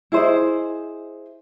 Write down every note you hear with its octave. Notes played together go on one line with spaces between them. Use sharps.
E4 G#4 C5 D#5